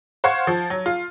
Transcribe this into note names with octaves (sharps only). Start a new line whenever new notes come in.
C5 F5 F#5 C#6 G#6
F3
F#3
F4